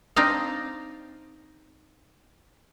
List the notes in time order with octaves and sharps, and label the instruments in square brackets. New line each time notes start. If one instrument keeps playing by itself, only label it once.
[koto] C4 D4 D#4 D#5 F5